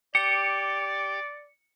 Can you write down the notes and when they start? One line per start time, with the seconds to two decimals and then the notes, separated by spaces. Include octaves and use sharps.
0.15 G4 D5 C#7